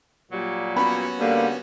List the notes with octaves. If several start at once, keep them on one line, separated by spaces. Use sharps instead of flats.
A#2 F#3 G3
B3 C#4 F#4 B5
G2 D3 G3 A#3